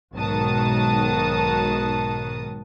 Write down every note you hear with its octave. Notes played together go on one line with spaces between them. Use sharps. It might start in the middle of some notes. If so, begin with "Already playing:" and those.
B1 G#2 D#3 F#4 A5 D#6